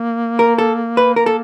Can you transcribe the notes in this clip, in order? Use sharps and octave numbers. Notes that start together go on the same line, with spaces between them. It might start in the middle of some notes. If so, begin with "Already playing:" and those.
Already playing: A#3
A#4
A4
B4
A#3 A#4
A4